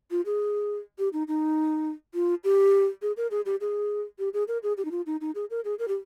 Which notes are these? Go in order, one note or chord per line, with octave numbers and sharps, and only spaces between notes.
F4
G#4
G4
D#4
D#4
F4
G4
G#4
A#4
G#4
G4
G#4
G4
G#4
A#4
G#4
G4
D#4
F4
D#4
D#4
G#4
A#4
G#4
A#4
G4